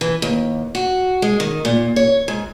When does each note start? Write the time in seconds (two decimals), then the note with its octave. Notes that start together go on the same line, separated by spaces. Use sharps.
0.01 E3
0.22 D#2
0.75 F#4
1.22 G#3
1.40 D#3
1.65 A#2
1.96 C#5
2.28 G#2